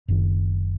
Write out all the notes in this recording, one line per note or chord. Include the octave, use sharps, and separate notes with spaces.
F#1 F#2 D#3